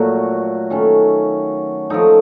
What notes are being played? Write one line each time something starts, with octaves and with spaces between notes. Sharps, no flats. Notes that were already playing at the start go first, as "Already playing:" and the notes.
Already playing: A#2 F#3 A3 F#4
D#3 A3 C#4
F3 A3 D#4 A4